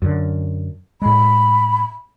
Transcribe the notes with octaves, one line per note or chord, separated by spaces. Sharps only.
F#2 D3
A2 G#3 B5